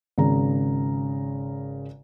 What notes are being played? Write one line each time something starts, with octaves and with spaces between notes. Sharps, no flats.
G#1 C#3 A#5